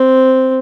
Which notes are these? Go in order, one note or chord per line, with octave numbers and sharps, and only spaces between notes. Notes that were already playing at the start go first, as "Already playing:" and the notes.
Already playing: C4